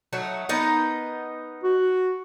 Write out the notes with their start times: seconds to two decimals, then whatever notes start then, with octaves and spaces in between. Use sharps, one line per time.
0.13 F#3 A3 D#4
0.49 B3 D#4 A#4
1.63 F#4